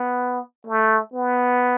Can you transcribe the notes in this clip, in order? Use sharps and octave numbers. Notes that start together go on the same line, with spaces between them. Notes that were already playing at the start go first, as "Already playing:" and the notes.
Already playing: B3
A3
B3